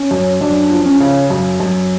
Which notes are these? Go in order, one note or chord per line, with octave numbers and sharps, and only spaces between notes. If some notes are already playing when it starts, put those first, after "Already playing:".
Already playing: C#4
F#2
F#2 D4
F3
C#4
C#3
F#2
F#2